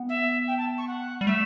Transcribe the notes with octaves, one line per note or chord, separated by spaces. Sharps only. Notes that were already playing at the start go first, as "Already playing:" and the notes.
Already playing: B3
E5
G5
A5
C#6
F#5
G3
A3 E5